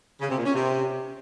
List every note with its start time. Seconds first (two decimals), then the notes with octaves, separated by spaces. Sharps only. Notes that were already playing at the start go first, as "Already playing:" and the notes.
0.20 C#3
0.29 C3
0.37 A#2
0.46 C#4
0.54 C3